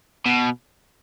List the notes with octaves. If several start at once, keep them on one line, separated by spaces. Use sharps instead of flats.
B2